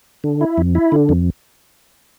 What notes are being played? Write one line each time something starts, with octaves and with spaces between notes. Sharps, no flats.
D3
E4
F2
E4
D3
F2